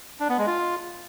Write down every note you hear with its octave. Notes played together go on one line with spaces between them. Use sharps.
D4
B3
G#3
F4